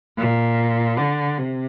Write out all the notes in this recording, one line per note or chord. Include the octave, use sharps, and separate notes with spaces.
A#2
D3
C3